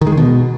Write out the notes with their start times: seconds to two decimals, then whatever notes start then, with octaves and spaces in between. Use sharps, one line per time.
0.01 D#3
0.07 G#3
0.12 D#3
0.17 B2